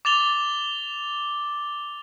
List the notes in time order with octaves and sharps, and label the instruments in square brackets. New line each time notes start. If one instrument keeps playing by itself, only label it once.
[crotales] D6 A6 F7 G7